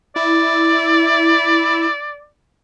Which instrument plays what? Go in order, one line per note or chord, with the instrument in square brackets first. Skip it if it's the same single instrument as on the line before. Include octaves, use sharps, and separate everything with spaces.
[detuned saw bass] E4 [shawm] D5